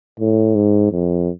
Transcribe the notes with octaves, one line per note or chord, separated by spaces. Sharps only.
A2
G#2
F2